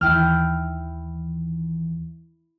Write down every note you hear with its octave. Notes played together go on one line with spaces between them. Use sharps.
D#2 E3 E4 G5 F6